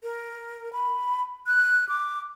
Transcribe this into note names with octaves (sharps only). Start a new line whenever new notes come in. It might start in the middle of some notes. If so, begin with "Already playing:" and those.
A#4
B5
F#6
D6